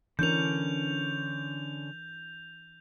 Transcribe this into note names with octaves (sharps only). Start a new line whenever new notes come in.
D3 E3 C#4 D4 A#4 G6 F7